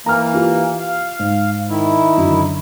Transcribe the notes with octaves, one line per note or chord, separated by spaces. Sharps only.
E3 A#3 A#5 F6
F4 G4
F5
G#2
D#3 E4
F#2 D3